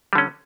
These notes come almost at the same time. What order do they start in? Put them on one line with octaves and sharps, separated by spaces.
G3 D3 C#4